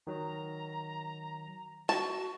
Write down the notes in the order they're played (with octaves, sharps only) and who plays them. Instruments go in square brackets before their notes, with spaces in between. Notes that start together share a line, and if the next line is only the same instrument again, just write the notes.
[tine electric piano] D#3 F#3 [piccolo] A#5
[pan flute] F#4 [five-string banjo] A5